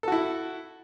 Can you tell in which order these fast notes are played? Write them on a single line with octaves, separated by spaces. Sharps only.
A4 F#4 E4